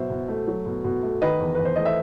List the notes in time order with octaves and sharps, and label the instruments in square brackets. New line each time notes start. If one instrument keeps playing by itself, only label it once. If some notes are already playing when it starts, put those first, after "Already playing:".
Already playing: [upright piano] B2 F#3 C5 E5
B2
A3
F#3
B2
B2
A3
D#3 B4 D#5
E2
E2 B4
C5
A3 D#5
E5